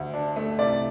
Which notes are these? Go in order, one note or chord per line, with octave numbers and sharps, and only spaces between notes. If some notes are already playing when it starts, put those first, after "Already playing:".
Already playing: D2
D4
A3
C2 D5